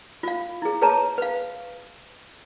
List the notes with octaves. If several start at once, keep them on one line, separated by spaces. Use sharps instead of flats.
F4 F5
E4 G#4
G#4 B4 C#5 A5 A#5
B4 F5